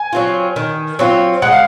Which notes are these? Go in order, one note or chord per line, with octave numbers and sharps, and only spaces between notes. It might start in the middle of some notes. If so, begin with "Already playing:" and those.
Already playing: G#5
F#3 C4 F4
D#3
F#3 C4 F4
G#3 F#5
F5